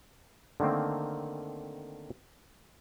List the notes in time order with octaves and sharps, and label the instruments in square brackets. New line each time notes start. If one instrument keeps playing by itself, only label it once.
[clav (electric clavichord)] D3 D#3 A3 A#3 C4